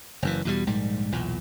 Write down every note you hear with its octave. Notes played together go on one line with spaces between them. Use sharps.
F#1 F#2 E3
E2 B2 G3
A#1 G#2 G3
B1 E2 A#2